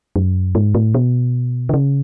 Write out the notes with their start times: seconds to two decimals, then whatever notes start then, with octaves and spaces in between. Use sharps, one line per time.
0.16 F#2
0.55 G#2
0.75 A2
0.95 B2
1.69 D3
1.74 C#3